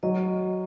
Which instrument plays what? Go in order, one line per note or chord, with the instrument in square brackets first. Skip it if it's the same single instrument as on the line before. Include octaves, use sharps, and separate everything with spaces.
[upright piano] F#3 [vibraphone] D#5